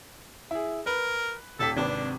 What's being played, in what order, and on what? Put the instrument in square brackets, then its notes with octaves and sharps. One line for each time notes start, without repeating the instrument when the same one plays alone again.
[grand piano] E4 G#4
[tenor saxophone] A#4 [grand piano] B4
[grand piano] D#1 G4 B6 [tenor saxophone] A4
[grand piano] G#1 C3 B4 [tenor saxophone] D4